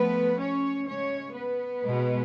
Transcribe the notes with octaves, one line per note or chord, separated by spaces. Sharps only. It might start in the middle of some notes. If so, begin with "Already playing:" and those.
Already playing: F3 A3 B3 B4
C#4 C#5
C#3 G#3 C#4 C#5
B3 B4
B2 G#3